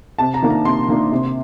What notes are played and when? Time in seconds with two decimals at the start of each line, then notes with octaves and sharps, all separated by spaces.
0.18 C3 A5
0.34 A#5
0.42 D#3 A#3 D4
0.50 A#5
0.65 C3 C6
0.88 D#3 A#3 D4
1.12 C3